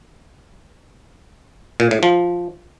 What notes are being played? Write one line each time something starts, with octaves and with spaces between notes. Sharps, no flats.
A#2
A2
F3